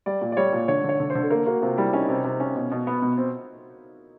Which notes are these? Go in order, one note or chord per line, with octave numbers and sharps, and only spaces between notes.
G3 D5
A#2
D5
G3 C#5
A#2
D3 C#5
D3 C#5
D3
C5
D3
A4
A#3 A#4
A#3 F#4
C3 F4
G3 E4
C#4 D#4
C3
C3
C#4
B2
B2
B3
B2
C4